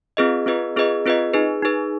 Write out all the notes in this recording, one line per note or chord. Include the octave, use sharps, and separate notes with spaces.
C4 F4 G#4 B4 D#5
C4 F4 G#4 B4 D#5
C4 F4 G#4 B4 D#5
C4 F4 G#4 B4 D#5
D#4 G#4 B4
D#4 G#4 B4